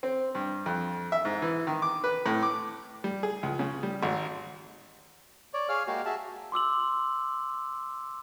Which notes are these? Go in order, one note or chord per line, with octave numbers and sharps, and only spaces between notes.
C4
G2
F2
E5
G#2
E3
D#3
D6
B4
A2
D6
G3
G#4
C#2
C#3
G3
G#1
C#5 D5
G#4 C#5 F5 F6
G#3 A#3 F#4 G4 F5
F#4 G#4 E5 A5
C6 D6 E6 F#7